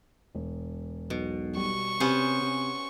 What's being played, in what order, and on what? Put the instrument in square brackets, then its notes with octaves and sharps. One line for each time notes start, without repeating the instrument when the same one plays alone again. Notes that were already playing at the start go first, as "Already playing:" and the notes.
[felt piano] E1
[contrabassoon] B1 [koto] B2
[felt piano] G3 [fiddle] C#6
[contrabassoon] C3 [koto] B3 C#4 C5 [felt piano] G4 G#5 C6
[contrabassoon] C3